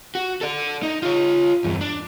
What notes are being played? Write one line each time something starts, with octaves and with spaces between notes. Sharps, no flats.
F#4
A4 D5
D#4
F4 C#5
E2 G2
D4